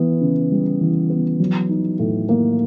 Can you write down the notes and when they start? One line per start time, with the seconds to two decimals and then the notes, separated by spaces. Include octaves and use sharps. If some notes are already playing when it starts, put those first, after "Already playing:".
Already playing: E3 B3
0.21 C#3
0.52 G3
0.81 E3
1.10 B3
1.40 F#3
1.69 D#4
1.99 A2
2.29 A#3